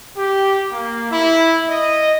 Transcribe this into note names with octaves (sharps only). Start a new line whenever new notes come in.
G4
A#3
E4
D#5